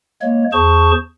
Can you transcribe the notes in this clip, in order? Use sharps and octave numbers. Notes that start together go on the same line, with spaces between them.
G#3 A#3 C#5
E2 G#4 C5 A5 C#6